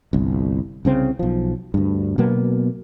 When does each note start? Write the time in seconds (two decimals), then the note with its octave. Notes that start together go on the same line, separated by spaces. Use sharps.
0.13 G1 C2
0.85 C2 C#3 C4
1.19 B1 F3
1.74 D2 G2
2.18 B2 F#3 A#3 B3